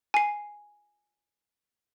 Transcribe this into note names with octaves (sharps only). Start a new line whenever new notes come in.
G#5 C7